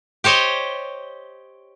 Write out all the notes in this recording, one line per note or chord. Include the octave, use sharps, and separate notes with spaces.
G4 C5 C#5 D#5